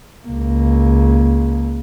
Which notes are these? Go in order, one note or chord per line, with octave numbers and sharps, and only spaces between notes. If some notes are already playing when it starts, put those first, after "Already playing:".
C#2 A#3